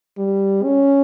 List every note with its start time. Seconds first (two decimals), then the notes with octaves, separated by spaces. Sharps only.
0.18 G3
0.64 C#4